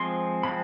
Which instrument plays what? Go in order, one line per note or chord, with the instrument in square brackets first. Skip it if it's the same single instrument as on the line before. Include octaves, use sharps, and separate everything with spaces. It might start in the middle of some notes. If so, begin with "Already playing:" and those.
Already playing: [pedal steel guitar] F3 G#3 C4 C6
F3 G#3 C4 B5